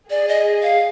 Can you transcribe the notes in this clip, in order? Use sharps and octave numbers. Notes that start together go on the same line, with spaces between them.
G#4 D5
D#5
F5